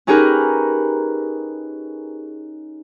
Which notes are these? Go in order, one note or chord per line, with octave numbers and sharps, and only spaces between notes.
C#4 D#4 G4 G#4 A#4 B4